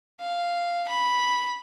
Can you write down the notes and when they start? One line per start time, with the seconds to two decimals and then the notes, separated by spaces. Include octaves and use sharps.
0.20 F5
0.88 B5